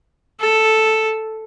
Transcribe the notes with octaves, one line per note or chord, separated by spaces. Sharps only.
A4